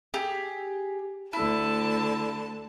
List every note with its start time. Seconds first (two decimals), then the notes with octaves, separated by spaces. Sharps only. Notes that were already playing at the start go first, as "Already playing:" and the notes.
0.14 G4 G#4
1.33 D2 D3 E4 A5